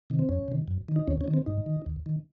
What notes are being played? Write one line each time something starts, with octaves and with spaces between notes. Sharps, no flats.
C3 D#3
C4
F2 C#4
C3 D#3
F#2
D#3
D#4
D#2 C#4
C#4
D#3
C4
G#2 D#4
D#3
D#2
D#3